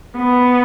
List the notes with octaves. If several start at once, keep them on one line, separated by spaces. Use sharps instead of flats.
B3